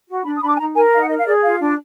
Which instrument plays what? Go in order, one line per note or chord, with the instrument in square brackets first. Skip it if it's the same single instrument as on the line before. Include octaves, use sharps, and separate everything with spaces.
[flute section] F#4
D4 B5
D#6
D4 B5
D6
G#5
D#4 A#5
A#4 G#5
D#4 F5
F#5
A#4 D#5
F5
G#4 D5
F4 F5
D4